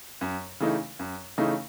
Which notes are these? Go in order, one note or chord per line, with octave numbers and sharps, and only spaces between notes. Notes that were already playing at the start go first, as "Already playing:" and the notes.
F#2
C#3 E3 A3 D#4
F#2
C#3 E3 A3 D#4